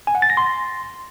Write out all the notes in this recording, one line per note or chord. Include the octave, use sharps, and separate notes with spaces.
G#5
F#5
A6
A#6
C6